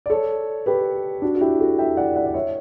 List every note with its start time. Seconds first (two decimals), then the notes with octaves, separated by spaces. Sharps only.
0.06 D5
0.10 A4 C#5
0.66 G4 B4
1.22 D4 F#4
1.35 F#4
1.41 E4 G4
1.60 F#4 A4
1.78 E5 G5
1.97 D5 F#5
2.16 D5 F#5
2.26 D5
2.34 C#5 E5